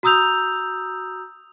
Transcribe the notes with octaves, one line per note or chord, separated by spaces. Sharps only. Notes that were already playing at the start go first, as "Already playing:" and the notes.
F#4 A#5 D#6 E6 G6 F7